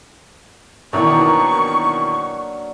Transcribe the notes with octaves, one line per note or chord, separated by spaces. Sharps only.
B2 D#3 E3 F#3 A#3 D4 C#6